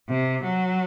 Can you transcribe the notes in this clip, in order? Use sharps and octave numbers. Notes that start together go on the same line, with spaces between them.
C3
F#3